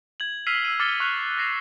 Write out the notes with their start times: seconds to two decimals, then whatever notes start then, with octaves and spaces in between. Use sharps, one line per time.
0.20 G#6 F#7
0.47 E6 F6 B6 C7 D#7 F7
0.65 E6 C7 D#7
0.80 D6 F6 A6 C#7 G7
1.00 C#6 F6 F#6 D#7 F7 G7
1.37 F6 A#6 C7 E7 F7